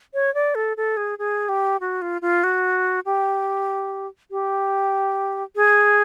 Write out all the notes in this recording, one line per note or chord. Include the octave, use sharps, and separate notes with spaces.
C#5
D5
A4
A4
G#4
G#4
G4
F#4
F4
F4
F#4
G4
G4
G#4